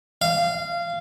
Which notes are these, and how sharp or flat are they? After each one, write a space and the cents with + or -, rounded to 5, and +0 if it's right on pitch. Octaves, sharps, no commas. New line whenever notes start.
F5 -20